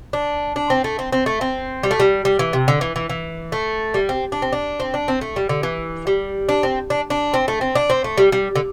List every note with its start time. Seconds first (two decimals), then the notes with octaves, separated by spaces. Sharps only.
0.13 D4
0.56 D4
0.70 C4
0.84 A3
0.99 C4
1.12 C4
1.26 A3
1.41 C4
1.83 G3
1.91 A3
2.00 G3
2.25 G3
2.39 E3
2.53 C3
2.68 D3
2.81 E3
2.96 E3
3.10 E3
3.52 A3
3.94 G3
4.09 C4
4.32 D4
4.42 C4
4.53 D4
4.80 C4
4.94 D4
5.08 C4
5.21 A3
5.36 G3
5.49 D3
5.63 E3
6.07 G3
6.49 D4
6.63 C4
6.90 D4
7.10 D4
7.34 C4
7.48 A3
7.61 C4
7.75 D4
7.90 C4
8.04 A3
8.18 G3
8.32 G3
8.55 D3